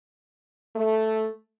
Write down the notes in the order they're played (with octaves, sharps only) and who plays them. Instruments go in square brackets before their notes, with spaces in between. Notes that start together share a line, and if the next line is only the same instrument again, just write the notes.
[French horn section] A3